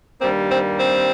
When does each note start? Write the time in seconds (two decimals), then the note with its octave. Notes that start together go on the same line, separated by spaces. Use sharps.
0.22 G2 D#3 G3 A#3 C4
0.51 C4
0.80 C4